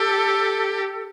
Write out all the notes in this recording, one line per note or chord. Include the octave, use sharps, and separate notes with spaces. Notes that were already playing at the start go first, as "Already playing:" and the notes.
Already playing: G4 A4